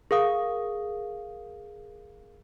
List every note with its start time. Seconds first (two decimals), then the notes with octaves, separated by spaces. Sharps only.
0.11 G#4 A#4 F5 D#6